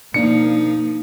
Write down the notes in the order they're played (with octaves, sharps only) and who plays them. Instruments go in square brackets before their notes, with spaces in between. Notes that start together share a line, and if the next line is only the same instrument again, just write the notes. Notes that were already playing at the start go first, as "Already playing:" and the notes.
[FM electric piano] B2 D4 [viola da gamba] F3 D#4 [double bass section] A#3 [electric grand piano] C#7